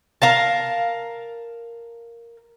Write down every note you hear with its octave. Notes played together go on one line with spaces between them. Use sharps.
A#4 F5 A5